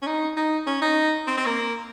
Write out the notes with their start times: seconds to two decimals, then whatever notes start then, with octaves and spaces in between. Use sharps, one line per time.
0.02 C#4
0.07 D#4
0.37 D#4
0.67 C#4
0.81 D#4
1.27 C4
1.37 C4
1.46 A#3